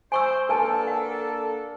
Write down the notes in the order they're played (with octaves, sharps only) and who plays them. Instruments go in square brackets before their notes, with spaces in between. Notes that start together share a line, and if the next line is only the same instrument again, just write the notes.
[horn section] C5 [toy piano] G#5 C#6 E6
[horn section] A#3 D4 A4 [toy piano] B4 G#5 A5
[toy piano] F#5